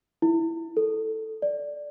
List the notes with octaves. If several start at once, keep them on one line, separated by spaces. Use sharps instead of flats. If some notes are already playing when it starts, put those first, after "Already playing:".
E4
A4
D5